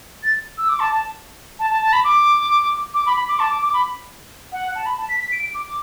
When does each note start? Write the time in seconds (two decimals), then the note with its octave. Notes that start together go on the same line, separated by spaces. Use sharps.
0.23 A6
0.57 E6
0.68 D6
0.80 A5
0.91 A5
1.59 A5
1.70 A5
1.81 A5
1.92 B5
2.04 D6
2.94 D6
3.06 B5
3.16 B5
3.28 D6
3.39 A5
3.51 D6
3.62 D6
3.73 B5
4.52 F#5
4.75 A5
4.86 B5
4.97 A5
5.08 B6
5.20 B6
5.32 D7
5.43 D7
5.54 D6